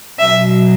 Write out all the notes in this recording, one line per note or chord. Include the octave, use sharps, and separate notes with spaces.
B2 F#3 E5